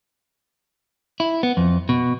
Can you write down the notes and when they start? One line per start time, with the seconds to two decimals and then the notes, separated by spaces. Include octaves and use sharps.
1.20 E4
1.43 B3
1.57 F2
1.89 B2